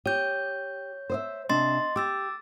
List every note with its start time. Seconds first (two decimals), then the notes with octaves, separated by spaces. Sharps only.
0.06 G4 C#5 G6
1.10 C5 D#5 E5
1.49 C3 D4 D#5 C6 A6
1.96 G4 D6 E6 A6